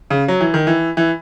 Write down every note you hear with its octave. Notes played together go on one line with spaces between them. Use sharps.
C#3
F#3
E3
D#3
E3
E3